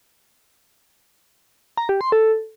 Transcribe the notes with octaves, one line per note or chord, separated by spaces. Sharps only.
A#5
G4
C6
A4